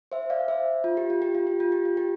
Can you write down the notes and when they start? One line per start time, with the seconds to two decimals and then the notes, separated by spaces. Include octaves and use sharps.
0.12 C5 E5
0.30 D5 F5
0.48 C5 E5
0.84 F4
0.97 G4
1.10 F4
1.22 G4
1.35 F4
1.47 G4
1.60 F4
1.72 G4
1.85 F4
1.97 G4